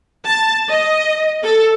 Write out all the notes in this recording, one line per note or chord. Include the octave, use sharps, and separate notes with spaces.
A5
D#5
A4